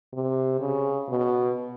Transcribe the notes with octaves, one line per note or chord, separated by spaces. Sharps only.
C3
C#3
B2